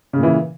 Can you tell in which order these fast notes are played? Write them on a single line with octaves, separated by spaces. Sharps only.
C#3 A#2 E3